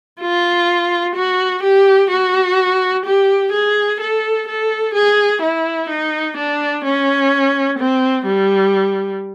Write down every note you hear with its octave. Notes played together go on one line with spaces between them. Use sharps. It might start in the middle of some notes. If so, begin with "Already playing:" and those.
F4
F#4
G4
F#4
G4
G#4
A4
A4
G#4
E4
D#4
D4
C#4
C4
G3